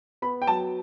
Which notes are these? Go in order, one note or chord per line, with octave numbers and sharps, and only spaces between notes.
B3 B5
G5
F#3 A5